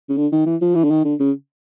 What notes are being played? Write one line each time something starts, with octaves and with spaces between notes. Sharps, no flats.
C#3
D3
D#3
E3
F3
E3
D3
D#3
D3
C#3